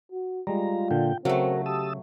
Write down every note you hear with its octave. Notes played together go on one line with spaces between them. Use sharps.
F#4
G3 G#3 F4 A#5
A#2 D3 G5
C#3 F#3 A3 C4 F#4 A#4 E5
G4 A5 D#6 E6